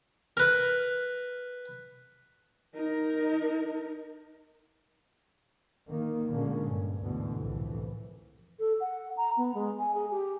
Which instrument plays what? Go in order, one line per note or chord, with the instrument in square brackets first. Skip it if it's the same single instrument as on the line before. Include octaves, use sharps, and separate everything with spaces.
[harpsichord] A#4 B4
[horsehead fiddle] D#4 A#4
[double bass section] D#3 A#3
A#2 D3 G#3 A#3 C#4
G2
D2 G#2 B2 D3 E3
C2 F2 A2 E3
[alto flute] A4
F#5
A#5
B3
G#3
G#5
G#4
G4